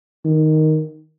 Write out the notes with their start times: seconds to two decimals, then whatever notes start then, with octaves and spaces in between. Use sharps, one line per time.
0.25 D#3